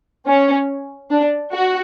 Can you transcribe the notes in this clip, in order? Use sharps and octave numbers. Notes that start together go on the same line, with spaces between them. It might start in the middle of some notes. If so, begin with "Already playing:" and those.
C#4
D4
F#4